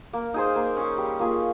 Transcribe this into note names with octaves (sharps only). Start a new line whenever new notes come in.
A#3
D#4 G#4 C5
A#3
C#4 G#4
G3
A#3 F4 G#4